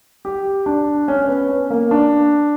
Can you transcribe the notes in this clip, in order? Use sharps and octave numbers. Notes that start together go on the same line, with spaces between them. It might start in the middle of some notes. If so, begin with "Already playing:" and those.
G4
D4
C#4
C#4
B3
C#4
A#3
D4